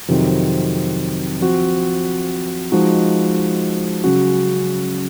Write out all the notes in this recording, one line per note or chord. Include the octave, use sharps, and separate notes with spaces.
F2 C3 D#3 F#3 C4
F3 C4 F#4
F3 G#3 D#4 F#4
C#3 F#3 C#4 F#4